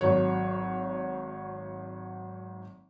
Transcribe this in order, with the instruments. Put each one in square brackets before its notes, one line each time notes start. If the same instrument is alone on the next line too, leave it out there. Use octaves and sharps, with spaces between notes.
[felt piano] G#1 F#3 C#5